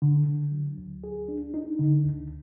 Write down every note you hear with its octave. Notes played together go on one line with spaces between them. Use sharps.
D3
D3
F#3
D2
G#4
D4
D#4
D3
D2